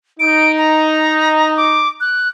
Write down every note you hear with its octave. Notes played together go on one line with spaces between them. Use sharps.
D#4 D7
A#5
D6
F#6